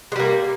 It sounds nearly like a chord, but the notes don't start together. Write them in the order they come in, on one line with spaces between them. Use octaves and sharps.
G#3 G3 A#3